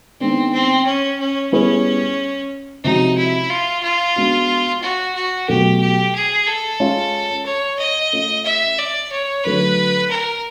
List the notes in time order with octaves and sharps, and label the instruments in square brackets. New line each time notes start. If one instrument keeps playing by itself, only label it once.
[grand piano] D#3 G#3 B3 D4 [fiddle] C4
[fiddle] C4
C#4
C#4
[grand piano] G3 B3 E4 G#4 B4 [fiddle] C#4
[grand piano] C3 F3 G#3 C#4 F#4 [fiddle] D#4
[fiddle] E4
F4
F4
[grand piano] G#3 B3 D4 F#4
[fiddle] F#4
F#4
[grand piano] B2 F#3 A3 [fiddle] G4
[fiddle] G4
G#4
A4
[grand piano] G#3 C#4 F4
[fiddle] C#5
D#5
[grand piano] A3 C#4 F4
[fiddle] E5
D5
C#5
[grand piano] D3 F#3 A3 [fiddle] B4
[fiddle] A#4